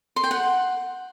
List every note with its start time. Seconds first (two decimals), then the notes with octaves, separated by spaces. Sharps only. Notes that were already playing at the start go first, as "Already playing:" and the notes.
0.16 C6
0.24 G5
0.31 F#5